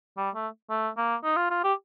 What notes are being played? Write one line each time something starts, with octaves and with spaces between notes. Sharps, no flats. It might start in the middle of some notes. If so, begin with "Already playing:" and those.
G3
A3
A3
A#3
D#4
F4
F4
G4